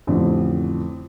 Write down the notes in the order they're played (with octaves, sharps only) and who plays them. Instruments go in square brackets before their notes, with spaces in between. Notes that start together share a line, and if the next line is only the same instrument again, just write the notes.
[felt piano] A1 F2 D3